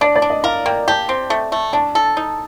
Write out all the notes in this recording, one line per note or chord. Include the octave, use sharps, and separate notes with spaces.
D4 D5
D5
D4
D#5
A#4 F5
A#3 G5
G4 A5
C4
A3
A3
D4 A5
A4
D#4